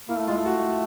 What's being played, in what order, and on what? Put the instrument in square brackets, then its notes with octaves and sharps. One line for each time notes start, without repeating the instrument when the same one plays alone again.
[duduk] A#3 [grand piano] E4
[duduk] A3
[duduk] G#3 [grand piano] F4
[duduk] A3
[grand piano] F#4